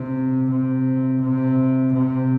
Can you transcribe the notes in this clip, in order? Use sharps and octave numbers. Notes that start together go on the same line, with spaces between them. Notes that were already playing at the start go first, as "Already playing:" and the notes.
Already playing: C3
C3
C3
C3